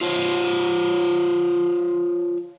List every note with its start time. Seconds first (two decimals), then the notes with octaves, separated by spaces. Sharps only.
0.01 F4 C5 C#5